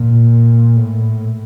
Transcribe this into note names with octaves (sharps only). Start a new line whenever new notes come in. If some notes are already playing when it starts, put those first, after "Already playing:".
Already playing: A#2
A2